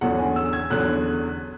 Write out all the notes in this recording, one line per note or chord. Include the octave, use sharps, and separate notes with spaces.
E2 D3 F#3 C#4 F#5
G#5
E6
G#6
E2 D3 F#3 C#4 F#6